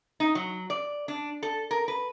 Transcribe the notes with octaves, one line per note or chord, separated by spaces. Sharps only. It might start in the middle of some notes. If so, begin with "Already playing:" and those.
D#4
F#3
D5
D4
A4
A#4
B4